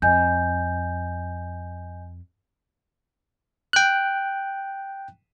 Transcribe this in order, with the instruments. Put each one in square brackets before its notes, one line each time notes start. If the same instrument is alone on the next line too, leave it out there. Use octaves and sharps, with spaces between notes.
[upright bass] F2 [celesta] D#5 G#5 G6
[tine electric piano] G5 F#6